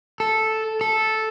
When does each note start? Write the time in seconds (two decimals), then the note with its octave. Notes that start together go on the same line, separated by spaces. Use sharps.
0.20 A4
0.81 A4